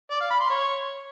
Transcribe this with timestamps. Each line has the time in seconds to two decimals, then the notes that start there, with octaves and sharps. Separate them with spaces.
0.11 D5
0.20 F5
0.30 B5
0.40 C6
0.50 C#5